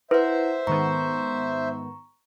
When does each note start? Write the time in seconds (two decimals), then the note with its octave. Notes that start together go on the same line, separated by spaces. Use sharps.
0.11 E4 B4 C5 E5 F#5
0.67 G#2 D#3 B3 A#5 C#6